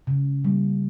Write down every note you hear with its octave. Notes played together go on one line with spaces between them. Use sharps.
C#3
G3 A#3